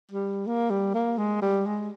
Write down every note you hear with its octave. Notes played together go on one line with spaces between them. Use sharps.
G3
A#3
G3
A#3
G#3
G3
G#3